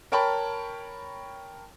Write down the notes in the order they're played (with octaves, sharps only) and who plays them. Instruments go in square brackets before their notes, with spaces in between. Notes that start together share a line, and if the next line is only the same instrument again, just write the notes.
[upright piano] A#4 C#5 G5 A5 B5